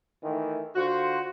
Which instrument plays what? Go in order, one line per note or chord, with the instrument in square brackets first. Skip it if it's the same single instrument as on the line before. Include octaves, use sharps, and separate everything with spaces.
[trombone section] D#3 E3 A3
[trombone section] D3 F4 C5 [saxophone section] F#4